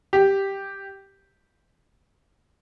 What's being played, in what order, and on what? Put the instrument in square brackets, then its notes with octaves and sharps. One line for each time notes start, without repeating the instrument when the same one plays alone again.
[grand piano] G4